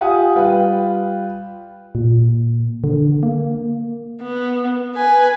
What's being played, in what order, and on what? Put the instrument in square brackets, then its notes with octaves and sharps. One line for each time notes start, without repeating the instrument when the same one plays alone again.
[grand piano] F4 G4 F#5 G#5 D#6
G3 F4 B4 G5
[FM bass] A#2
D3
A#3
[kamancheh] B3
B4 G#5